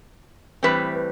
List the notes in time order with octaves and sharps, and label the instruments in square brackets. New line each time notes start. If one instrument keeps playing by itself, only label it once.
[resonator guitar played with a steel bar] A2 E3 G3 C4 B4